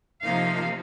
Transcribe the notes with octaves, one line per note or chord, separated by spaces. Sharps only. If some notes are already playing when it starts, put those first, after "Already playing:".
C3 F3 A#3 D#4 F5